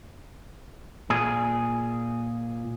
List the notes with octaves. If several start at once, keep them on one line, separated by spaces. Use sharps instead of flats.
A#2 G#4